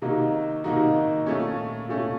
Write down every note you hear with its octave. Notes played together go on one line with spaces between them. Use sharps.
C3 D#3 A#3 D#4 F#4
C3 D#3 A#3 D#4 F#4
A#2 A3 C#4
A#2 A3 C#4